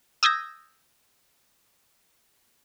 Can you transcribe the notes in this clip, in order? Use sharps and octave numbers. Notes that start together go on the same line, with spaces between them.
D#6 E6 G6 G#6 A#6